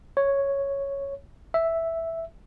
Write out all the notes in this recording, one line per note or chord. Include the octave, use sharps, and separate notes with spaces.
C#5
E5